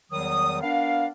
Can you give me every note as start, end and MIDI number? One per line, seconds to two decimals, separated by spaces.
0.12 0.62 40
0.12 0.62 51
0.12 0.62 54
0.12 0.62 55
0.12 0.62 87
0.62 1.06 59
0.62 1.06 62
0.62 1.06 70
0.62 1.06 77